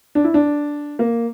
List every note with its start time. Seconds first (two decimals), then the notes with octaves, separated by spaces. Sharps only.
0.15 D4
0.24 E4
0.34 D4
0.99 A#3